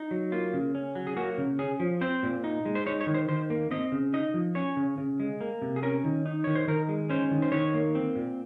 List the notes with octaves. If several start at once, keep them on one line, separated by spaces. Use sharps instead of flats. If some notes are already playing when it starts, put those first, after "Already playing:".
Already playing: D#4
F#3
A#3 F4
C#3
C#4
F#3
G#4
A#3 F#4
C#3
C#4 G#4
F3
C4 C5
A#2
D#4
G#3
C5
D#4 C#5
C#5
D#3
C5
D#3 C5
A#3
C4 D#5
C#3
D#4 D#5
F3
C#4 C#5
C#3
C#3
G#3
A#3
C3
G#4
C#4 A#4
D#3
D#4
D#3 C#5
C5
D#3 A#4
G#3
C#4 C5
D#3
C5
D#3 C#5
A#3
C4
A#2